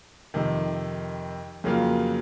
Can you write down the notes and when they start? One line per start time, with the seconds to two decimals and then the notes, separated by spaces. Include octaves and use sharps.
0.34 F2 C3 D#3
1.64 F2 C#3 F#3 A#3 F4